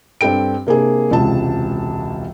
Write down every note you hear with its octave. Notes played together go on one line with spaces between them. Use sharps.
G2 C4 A4 G5 D7
C3 A#3 D4 G#4
E1 C#2 C3 A5